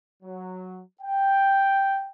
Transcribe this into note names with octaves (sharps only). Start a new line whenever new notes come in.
F#3
G5